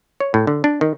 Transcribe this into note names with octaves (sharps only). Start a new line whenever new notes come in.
C#5
A2
D3
D4
D#3